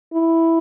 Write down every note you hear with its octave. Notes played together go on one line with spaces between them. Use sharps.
E4